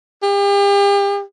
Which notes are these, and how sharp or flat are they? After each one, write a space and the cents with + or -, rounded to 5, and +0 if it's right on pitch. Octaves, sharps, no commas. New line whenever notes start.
G4 +40